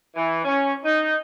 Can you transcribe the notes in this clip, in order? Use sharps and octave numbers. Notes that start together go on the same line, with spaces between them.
E3
C#4
D#4